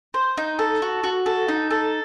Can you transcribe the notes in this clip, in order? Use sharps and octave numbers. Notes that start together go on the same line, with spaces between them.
C5
D#4
A4
F#4
F#4
A4
D#4
A4